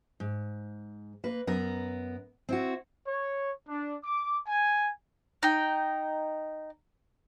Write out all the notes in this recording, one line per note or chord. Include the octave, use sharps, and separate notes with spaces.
G#2
A#3 B4
F#2 B3 A#4
C4 E4 F#4
C#5
D4
D6
G#5
D#4 G5